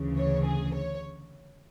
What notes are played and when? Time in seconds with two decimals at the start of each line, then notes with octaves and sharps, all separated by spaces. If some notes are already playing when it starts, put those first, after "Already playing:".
Already playing: D2 C#3 E3
0.17 C#5
0.45 G#4
0.74 C#5